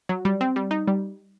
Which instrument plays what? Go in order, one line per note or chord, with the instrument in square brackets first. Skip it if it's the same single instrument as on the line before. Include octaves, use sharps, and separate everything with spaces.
[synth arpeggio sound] F#3
G3
C4
G3
D#4
G3